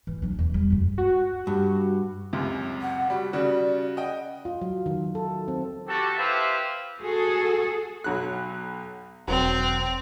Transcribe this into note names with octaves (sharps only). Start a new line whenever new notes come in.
E3
F#3 D4
E2
G3
C#2 F#2
F#4
G2
C#2 F#2 C3
F#5
G3 F#4
C#3 G3 F#4 D5
D#5 F#5 G5
F4
F#3
D#3
A4
C4
F#4 G4 A4
E4 G4 B4 C5 E5 F5
F#4 G#4 A4
B1 F#3 F#6
E1 F#3 C4